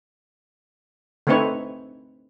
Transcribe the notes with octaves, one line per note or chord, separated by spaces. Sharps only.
D3 A3 C4 D#4 B4 C#5